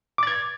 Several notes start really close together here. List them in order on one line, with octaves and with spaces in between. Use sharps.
D6 A6 G#6